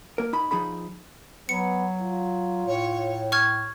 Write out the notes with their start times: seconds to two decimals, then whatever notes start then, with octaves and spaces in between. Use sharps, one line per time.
0.18 A#3 A#4
0.33 D#4 B5
0.51 F3 D#4 G#4 B5
1.49 F#3 B3 C#7
2.01 F4
2.67 A2 C#5
3.32 C#6 F6 G#6